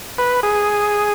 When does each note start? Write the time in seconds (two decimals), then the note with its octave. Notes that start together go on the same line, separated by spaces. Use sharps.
0.18 B4
0.43 G#4